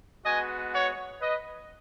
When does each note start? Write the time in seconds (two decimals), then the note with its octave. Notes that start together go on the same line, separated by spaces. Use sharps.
0.25 G#3 B3 F#4 D#5 G#5
0.73 C#5 F#5
1.21 B4 D#5